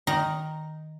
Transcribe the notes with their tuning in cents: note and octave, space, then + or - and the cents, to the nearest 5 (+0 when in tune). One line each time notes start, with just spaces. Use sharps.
D#3 +0 A#5 +0